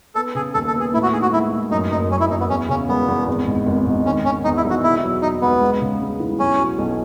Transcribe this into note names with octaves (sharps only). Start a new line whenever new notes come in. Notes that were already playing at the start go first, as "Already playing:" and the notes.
B3 A4
C#3 G#4
D#2 A4
A4
B3
G#4
A2 E4
F#4
D#4 G#4
F#4
G#3 E4
A2
F#2 D#4
F#1 D#4
F#1 C#4
E4
F#1 D#4
B3
E2 C#4
C#3 C#4
E1 B3
E2
G#1
G#2
G#1
G#2
D#3 C#4
D#3 C#4
E2 D#4
E4
E1
F#4
B2 E4
F#3
F#3 D#4
C#2 B3
G#3
C#3
G#3
E3
B1 C#4
F#3
B1